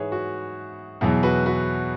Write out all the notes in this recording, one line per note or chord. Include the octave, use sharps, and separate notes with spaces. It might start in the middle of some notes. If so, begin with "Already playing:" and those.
Already playing: G#2 E3 G#4 B4 C#5 E5
F#4
E2 B2 F#3 E4 G#4
F#4 B4
F#4 B4